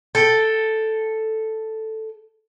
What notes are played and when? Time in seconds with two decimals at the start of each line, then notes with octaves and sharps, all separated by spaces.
0.15 A4 G5